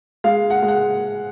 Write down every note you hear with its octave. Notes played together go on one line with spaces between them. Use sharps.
G#3 F5
F#5
G#3
F#5